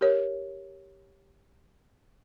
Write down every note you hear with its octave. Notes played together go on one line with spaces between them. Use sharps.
G4 A#4 C#5